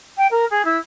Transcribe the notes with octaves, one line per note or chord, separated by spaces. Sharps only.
G5
A#4
G#4
E4